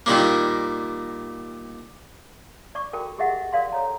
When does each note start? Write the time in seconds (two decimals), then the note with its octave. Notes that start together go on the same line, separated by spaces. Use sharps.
0.06 A#2 D#3 G3 A#3
2.75 D5 C#6 D6
2.93 F#4 A4 A#4 G5
3.19 G4 G#4 D#5 E5 F#5
3.53 A#4 D5 F5 C6
3.72 A4 C#5 A#5